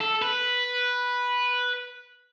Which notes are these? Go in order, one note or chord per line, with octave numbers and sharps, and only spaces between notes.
A4
B4